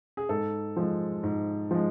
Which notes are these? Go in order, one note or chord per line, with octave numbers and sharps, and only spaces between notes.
G#4
G#2 A4
F3 G#3
G#2
F3 G#3